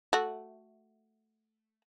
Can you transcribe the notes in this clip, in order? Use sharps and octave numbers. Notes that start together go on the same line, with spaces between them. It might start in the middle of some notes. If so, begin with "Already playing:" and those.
A3 F#4